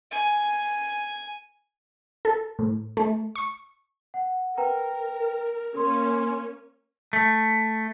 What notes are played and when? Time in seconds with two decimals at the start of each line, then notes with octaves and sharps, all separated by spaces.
0.11 G#5
2.25 A4
2.59 A2
2.97 A3
3.36 C#6
4.14 F#5
4.57 A#4 B4 G5 A#5
5.75 A#3 C#4 A#4 C6
7.13 A3